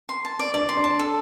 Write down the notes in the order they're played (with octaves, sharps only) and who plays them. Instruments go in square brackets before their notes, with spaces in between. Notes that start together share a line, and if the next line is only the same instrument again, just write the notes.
[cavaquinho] C6
A5
D5
[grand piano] D4 [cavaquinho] D5
[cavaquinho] C6
[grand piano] D4
[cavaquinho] A5
A4